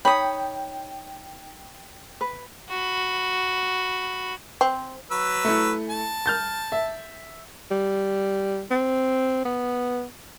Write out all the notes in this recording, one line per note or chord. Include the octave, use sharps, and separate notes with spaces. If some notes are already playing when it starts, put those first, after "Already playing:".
D#4 C#5 G5 B5 D#6
B4
F#4 B5
C4
F#3 B4 E6
A3 E4
A5
F6 G6 A6
E5
G3
C4
B3